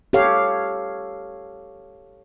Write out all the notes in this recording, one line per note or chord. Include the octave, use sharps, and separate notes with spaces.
G4 A4 C#5 F5